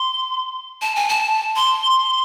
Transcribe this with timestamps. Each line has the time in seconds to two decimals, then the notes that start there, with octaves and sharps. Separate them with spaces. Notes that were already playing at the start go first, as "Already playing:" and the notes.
Already playing: C6
0.82 A5
0.96 G#5
1.09 A5
1.56 C6